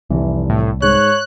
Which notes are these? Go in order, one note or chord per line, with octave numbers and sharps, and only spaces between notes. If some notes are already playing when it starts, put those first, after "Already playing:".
F1 C2 E3
A2
G#2 G#3 C#5 F#6